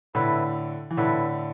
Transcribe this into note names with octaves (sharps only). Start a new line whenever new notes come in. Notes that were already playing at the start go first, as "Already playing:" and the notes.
A2 D3 E4 B4 E5
E3
A2 D3 E4 B4 E5